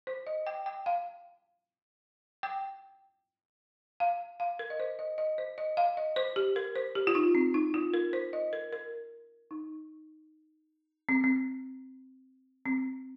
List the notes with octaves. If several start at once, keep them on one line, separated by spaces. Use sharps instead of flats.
C5
D#5
G5
G5
F5
G5
F5
F5
A#4
D#5
C5
D#5
D#5
C5
D#5
F5
D#5
C5
G4
A#4
C5
G4
F4
D#4
C4
D#4
F4
A#4
C5
D#5
A#4
A#4
D#4
C4
C4
C4